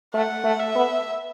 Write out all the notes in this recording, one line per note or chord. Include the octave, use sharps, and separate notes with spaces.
A3 F#5
A3
E5
B3